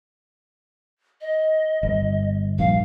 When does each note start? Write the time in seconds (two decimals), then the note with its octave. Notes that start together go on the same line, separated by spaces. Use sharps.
1.21 D#5
1.83 G1
2.59 A#1 G2 F5